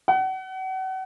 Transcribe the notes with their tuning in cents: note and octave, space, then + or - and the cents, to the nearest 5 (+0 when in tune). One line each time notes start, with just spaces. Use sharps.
F#5 +35